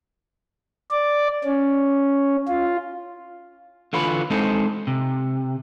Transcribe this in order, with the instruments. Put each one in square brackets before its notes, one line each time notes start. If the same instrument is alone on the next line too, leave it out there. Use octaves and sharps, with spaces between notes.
[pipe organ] D5
C#4
F4
[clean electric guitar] D3 E3 F4 B4 C#5 B5
G#3 C4 D#4 A4 C5
C3